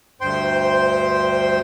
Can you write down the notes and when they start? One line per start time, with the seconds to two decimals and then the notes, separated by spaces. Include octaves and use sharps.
0.21 D2 G2 C5 G5 C6